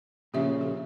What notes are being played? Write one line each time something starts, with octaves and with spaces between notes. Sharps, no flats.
A#2 C#3 F3 G4 E5
A4